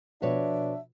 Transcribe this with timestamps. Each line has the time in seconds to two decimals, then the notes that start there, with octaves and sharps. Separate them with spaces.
0.22 B2 F3 D4 F#4 B4 C#5 E5